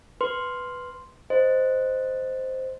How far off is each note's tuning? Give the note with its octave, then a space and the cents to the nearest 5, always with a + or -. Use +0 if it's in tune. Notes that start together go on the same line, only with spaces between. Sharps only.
B4 +0 C6 +0
C5 -5 D#5 +0